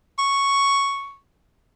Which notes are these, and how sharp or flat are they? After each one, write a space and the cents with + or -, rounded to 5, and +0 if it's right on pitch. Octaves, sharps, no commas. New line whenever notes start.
C#6 +0